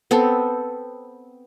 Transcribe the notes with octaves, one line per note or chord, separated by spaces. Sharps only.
B3 C4 A4